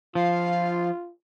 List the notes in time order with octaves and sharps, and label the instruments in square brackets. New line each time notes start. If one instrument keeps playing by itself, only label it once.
[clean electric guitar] F3 [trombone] F4 [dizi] F5